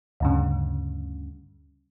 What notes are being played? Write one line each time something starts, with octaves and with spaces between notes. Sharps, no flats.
D2 G2 C#3